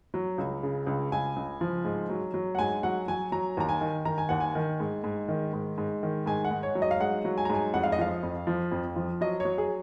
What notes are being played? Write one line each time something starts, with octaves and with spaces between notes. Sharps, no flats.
F#3
C#2
C#3
C#2
C#2 G#5
C#2
F3
G#2
F#3
F#3
F#5
G#2 G#5
F#3 F#5
F#3 G#5
F#3 A#5
D#2 A#5
G#5
D#3
D#3 A#5
G#5
D#2 F#5
G#5
D#3
G#2
G#2
D#3
G#2
G#2
D#3
G#2 G#5
F#5
G#2
C#5
F#3
D#5
F5
G#2 F#5
F#3
G#5
A#5
G#2 G#5
F2 F#5
F5
D#5
F3 F5
F2
F3
F2
F3
F#3 D#5
F#3 C#5
G#4